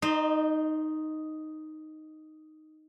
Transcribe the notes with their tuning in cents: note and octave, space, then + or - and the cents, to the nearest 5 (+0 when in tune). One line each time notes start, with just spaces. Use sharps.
D#4 +0 C5 +0 D#5 -40